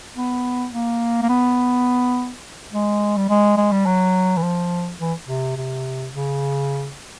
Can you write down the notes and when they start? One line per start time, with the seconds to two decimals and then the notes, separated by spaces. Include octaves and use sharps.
0.15 B3
0.72 A#3
1.22 A#3
1.29 B3
2.72 G#3
3.17 G3
3.29 G#3
3.57 G#3
3.72 G3
3.86 F#3
4.37 E3
4.43 F3
5.00 E3
5.28 C3
5.57 C3
6.14 C#3